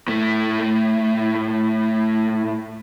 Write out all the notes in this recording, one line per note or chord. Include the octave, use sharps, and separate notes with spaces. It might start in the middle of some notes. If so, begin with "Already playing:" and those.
A2 A3